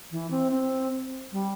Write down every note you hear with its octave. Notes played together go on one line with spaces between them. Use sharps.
E3
C4
C4
G3